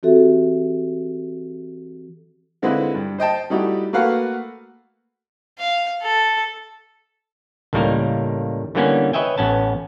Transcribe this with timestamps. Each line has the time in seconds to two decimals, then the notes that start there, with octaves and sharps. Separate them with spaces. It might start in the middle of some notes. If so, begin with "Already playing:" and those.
0.03 E3 C4 F#4 G4 A4 E5
2.62 D3 G#3 C4 E4 F4 B4
2.95 G2
3.18 C5 D#5 G5 A5
3.50 G3 A3 D#4 E4 F#4 G4
3.93 A3 A#3 F#4 B4 F5 F#5
5.59 F5
6.02 A4
7.73 C#2 A2 D#3 G3 A#3 A#4
8.75 D3 E3 G3 A#3 B3 C#4
9.13 B4 C#5 D#5 E5 G5 G#5
9.38 A1 B3 C#4 A5